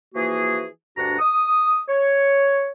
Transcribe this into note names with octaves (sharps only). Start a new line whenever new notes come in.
E3 F3 A#3 F#4 G#4
D2 G2 D4 F#4 F#5 A#5
D#6
C#5